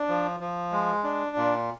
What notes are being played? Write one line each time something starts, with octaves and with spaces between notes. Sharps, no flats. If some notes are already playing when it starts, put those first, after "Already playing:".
Already playing: D4
F3
F3
G#3
D4
A#2